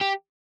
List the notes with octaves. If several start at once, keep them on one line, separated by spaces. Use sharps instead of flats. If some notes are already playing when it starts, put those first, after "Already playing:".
G4